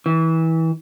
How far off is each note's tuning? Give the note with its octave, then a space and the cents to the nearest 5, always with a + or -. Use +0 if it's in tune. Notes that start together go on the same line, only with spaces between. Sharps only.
E3 -25